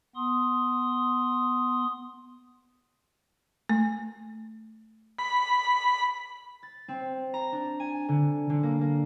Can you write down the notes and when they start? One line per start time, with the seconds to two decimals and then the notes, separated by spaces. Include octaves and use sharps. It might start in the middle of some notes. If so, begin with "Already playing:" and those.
0.16 B3 C6 D#6
3.69 A3
5.19 B5
6.63 A6
6.88 C4
7.34 A#5
7.52 D4
7.80 G#5
8.09 D3
8.50 D3
8.63 A#3
8.81 A#3